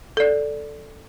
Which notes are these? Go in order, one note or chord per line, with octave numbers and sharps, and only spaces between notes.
A4 D5